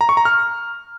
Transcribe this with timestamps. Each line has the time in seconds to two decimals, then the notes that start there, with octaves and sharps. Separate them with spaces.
0.01 A#5
0.09 C#6
0.17 A#5
0.25 F6